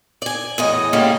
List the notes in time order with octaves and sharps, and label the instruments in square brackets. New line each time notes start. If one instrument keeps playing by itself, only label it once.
[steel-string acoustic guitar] D5 G#5
E2 A2 D#5
D3 G3 G#3 A#3 C#4